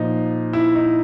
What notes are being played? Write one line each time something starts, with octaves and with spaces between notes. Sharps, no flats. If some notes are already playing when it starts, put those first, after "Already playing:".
Already playing: A#2 F3 D#4
E4
D#4